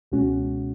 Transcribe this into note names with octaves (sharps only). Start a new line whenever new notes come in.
C#2 B2 G#3 C#4 F#4